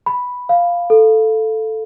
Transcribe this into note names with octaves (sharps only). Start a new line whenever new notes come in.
B5
F5
A4